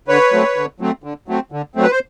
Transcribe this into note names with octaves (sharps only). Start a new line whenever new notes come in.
D3 B4 C#5
F#3 A3 C4
D3
F#3 A3 C4
D3
F#3 A3 C4
D3
F#3 A3 C4
B4
C5